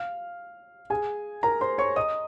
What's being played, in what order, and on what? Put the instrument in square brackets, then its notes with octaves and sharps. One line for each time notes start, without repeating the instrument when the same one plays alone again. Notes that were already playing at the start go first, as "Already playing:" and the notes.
Already playing: [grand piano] F5 F6
G#4 G#5
A#4 A#5
C5 C6
C#5 C#6
D#5 D#6